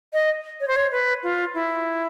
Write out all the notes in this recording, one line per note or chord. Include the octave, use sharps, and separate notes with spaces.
D#5
C#5
C5
C#5
B4
F4
E4